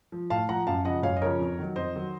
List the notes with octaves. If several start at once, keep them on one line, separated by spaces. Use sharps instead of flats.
F3
A2 F5 A5
F3 F#5 A#5
F#2 F5 A5
C#3 F3 D#5 F#5
F#2 C#5 F5
D#5
C#3 F3 A#4 C#5
F2
D#3 F#3
F2 C5 D#5
D#3 F#3